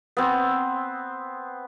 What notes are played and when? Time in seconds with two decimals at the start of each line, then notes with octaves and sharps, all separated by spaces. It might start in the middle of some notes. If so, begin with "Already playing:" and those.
0.17 B3 C4